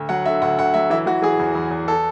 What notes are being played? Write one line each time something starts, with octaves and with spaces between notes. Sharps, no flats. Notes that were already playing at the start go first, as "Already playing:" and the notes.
Already playing: D2
F#3 F#5
D3 E5
D2 F#5
D2 F#5
F#3 E5
E3 E5
E3 F#4
E3 G#4
E2
E2
E2
A4